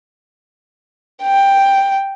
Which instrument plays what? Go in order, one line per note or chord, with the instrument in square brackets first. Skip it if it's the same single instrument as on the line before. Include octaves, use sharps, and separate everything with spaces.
[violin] G5